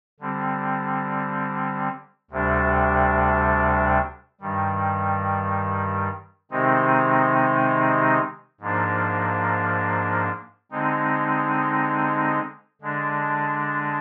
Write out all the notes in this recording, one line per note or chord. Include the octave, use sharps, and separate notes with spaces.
D3 G3 C4
D2 C3 G3 D4
G2 D#3 G3
C3 D#3 G#3 C4 D#4
G#2 F3 A#3 D4
D3 G#3 C4 D#4
D3 G#3 D4